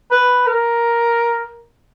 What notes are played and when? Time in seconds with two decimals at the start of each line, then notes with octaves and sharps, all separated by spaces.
0.11 B4
0.46 A#4